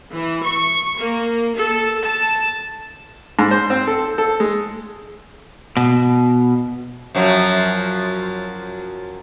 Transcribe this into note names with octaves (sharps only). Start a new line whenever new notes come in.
E3
C#6
A#3
A4
A5
G#2
C5
C4
A4
A4
G#3
B2
F#2 F3 F#3